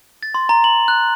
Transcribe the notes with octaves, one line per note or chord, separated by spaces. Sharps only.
A6
C6
A#5
F#7
F#6